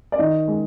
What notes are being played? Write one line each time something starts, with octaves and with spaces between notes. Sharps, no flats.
D5
D#3 D#5
G#3